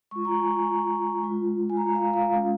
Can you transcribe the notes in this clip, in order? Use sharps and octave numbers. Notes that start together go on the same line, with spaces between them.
G#3 F4 C#6
A#5
G#5
G#5
A#5
G#3 F4
G#5
A#5
F5
F5
G#3 C#4 F4